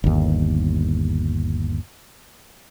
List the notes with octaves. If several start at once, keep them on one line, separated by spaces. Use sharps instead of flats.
G1 D#2